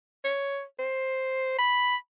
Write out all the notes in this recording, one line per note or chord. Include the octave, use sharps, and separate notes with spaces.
C#5
C5
B5